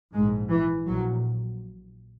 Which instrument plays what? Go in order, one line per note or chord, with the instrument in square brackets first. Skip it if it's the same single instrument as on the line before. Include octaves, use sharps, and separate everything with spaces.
[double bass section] A#1 G#2 G#3
E3
A#1 A#2 F#3